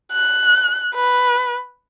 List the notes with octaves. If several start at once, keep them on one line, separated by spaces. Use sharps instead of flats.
F#6
B4